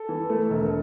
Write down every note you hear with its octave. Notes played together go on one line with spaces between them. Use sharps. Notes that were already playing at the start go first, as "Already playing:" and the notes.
Already playing: A4
E3
A3
E1